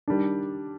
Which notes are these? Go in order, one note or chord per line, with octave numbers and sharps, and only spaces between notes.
D#3 G3 D4